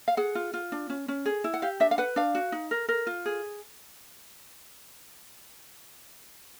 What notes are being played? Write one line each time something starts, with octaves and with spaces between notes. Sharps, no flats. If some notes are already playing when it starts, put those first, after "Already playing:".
F5
G#4 F#5
F4
F4
D4
C#4
C#4
G#4
E4
F#5
G4 F5
D4 E5
F5
B4 F#5
D4 F5
F#4
D#4
A#4
A#4
F4
G#4